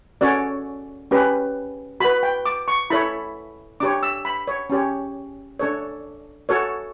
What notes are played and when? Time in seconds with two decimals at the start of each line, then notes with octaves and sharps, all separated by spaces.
0.21 C#4 F#4 A4 C#5 D5
1.11 C#4 G4 B4
2.00 F#4 B5
2.04 B4
2.23 G5
2.46 D6
2.68 C#6
2.90 E4 A4 C#5 B5
3.80 D4 G4 C#5 D6
4.03 E6
4.25 B5
4.48 C#5
4.70 C#4 G4 C#5
5.60 D4 A4 C#5
6.49 F#4 A4 C#5